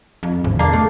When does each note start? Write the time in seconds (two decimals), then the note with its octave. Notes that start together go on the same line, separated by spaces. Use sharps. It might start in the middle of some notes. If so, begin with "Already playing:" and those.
0.23 F2
0.44 G#1 E2 D3
0.59 B1 A#3 D4 G#4 C7
0.73 A3